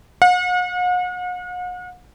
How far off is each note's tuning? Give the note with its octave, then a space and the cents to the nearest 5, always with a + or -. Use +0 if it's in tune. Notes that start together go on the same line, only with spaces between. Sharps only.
F#5 -45